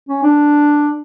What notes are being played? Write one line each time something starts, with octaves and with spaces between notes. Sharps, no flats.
C#4
D4